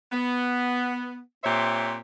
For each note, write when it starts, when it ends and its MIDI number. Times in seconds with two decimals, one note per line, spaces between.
0.12 1.19 59
1.43 1.96 46
1.43 1.96 60
1.43 1.96 67
1.43 1.96 72
1.43 1.96 73
1.43 1.96 76